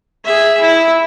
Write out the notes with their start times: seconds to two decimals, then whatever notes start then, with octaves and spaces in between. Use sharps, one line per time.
0.24 G#4 E5
0.61 E4